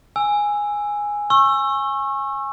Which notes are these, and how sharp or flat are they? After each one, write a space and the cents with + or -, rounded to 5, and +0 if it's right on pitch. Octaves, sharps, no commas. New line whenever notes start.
G#5 -5 E6 +5
C#6 -25 E6 +15